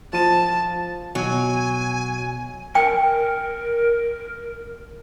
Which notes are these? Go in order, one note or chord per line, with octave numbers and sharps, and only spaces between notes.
F3 F4 A5 D#7
B2 F#3 G#5
A#4 G5